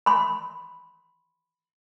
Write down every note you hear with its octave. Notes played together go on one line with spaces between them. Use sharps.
B5 C6